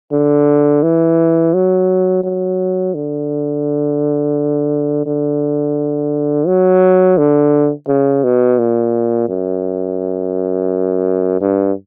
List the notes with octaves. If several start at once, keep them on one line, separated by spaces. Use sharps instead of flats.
D3
E3
F#3
F#3
D3
D3
F#3
D3
C#3
B2
A#2
F#2
G2